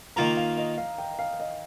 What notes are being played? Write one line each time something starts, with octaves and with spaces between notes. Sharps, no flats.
D#3 A#3 F4 A#4 A#5
F5
D#5
F5
G5
F5
D#5